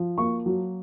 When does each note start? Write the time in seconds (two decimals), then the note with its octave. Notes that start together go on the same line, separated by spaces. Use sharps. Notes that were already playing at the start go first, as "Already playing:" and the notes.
Already playing: F3
0.17 A#3 C#6
0.46 F#3